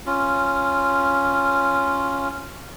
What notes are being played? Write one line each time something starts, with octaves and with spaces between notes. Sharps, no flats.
C#4 F4